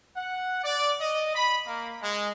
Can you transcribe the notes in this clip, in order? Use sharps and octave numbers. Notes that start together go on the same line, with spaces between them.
F#5
D5
D#5
B5
A#3
G#3